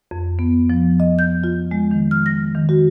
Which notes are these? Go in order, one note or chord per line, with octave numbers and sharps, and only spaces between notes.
F2
B3
F3
D#5
G6
F4
G#3
D#3
F6
A#6
D#3
F#4